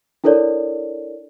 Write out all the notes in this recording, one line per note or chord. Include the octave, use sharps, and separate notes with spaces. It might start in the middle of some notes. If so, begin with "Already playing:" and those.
D4 E4 A4 A#4 C#5 D5